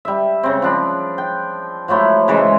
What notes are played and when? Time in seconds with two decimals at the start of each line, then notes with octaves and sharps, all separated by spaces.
0.05 G3 E5
0.43 C#3 C4
0.62 F3 D4 B5
1.18 G5
1.88 F3 F#3 A3 E4
2.28 C#3 E3 G#3